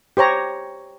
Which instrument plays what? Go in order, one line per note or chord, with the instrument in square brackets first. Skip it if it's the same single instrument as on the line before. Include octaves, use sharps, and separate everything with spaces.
[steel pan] G4 C5 C#5 A#5